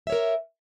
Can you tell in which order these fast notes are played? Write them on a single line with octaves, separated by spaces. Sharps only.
E5 C#5 A#4